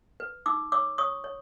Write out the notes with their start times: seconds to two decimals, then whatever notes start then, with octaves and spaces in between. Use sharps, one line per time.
0.20 B4
0.46 D#4 D6 E6
0.72 C#5 D6 E6
0.98 C#5 C#6 D#6
1.24 C#5